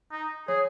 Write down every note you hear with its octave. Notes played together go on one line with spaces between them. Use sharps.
D#4
G#4 C#5